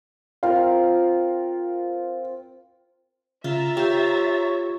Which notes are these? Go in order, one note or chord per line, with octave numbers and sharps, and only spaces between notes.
C4 F4 A#4 F5
C#3 F4 E5 A#5 A6
F4 G4 C5 C#5